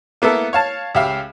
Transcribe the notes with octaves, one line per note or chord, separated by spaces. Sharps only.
A#3 B3 E4 A4
C#5 F5 A5
C#2 G4 E5 F5